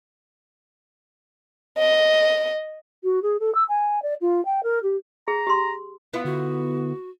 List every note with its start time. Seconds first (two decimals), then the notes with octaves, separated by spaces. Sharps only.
1.78 D#5
3.04 F#4
3.23 G#4
3.40 A4
3.55 E6
3.69 G#5
4.03 D5
4.21 F4
4.45 G5
4.64 A#4
4.83 G4
5.28 G#4 A#5
5.47 G4 C6
6.14 B3 E4 F4 F5
6.25 D3 F#4